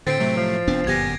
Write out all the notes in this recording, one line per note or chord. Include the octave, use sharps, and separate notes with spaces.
A2 D3 C4 G5 A6 C7 D7
C3 F#3 A3
F3
F1 B3 C4 D4
G1 F#2 A#2 B3 G4 G#5 G#6 A#6